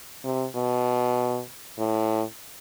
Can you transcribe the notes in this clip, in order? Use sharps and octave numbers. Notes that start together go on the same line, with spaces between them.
C3
B2
A2